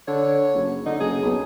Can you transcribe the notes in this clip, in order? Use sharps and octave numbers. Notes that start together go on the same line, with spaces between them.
D3 C#5
F#1
D3 D#4
F#1 G#4
B1